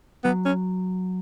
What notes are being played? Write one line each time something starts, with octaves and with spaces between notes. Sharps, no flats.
F#3 B3
C#4